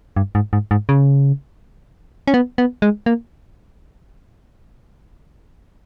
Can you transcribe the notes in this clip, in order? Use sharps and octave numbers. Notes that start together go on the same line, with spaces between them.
G2
G#2
G#2
G#2
C#3
C#4
B3
B3
G#3
A#3